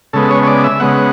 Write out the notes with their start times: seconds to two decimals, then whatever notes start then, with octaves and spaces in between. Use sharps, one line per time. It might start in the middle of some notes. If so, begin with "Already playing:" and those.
0.13 C#3 G#3 B3 A4
0.31 C#5
0.43 C#5
0.47 D5
0.64 E5
0.80 C#3 G#3 B3 F#5